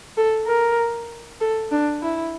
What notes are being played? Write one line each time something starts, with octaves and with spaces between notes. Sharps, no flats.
A4
A#4
A4
D4
E4